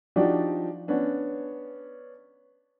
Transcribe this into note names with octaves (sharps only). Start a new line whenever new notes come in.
F3 D4 D#4 F#4 G4 D5
B3 C#4 D4